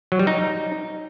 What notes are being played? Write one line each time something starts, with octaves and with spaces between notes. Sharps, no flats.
F#3
G3
D#4